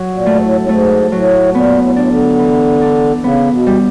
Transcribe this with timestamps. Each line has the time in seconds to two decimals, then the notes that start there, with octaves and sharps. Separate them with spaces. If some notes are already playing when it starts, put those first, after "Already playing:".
Already playing: F#3
0.12 A#2
0.26 A3
0.34 G#2
0.40 A2
0.61 A2
0.69 G#2 A3
1.12 A2 F#3
1.54 A#2 B3
1.82 A2
1.92 A#2
1.96 A2 D4
2.11 D3
2.39 E3
2.81 D4
3.24 C#3 B3
3.52 B2
3.66 G3